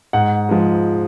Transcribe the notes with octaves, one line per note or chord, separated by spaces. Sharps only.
G#2 F#5
F3 G#3